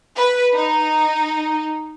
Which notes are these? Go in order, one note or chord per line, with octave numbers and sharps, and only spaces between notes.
B4
D#4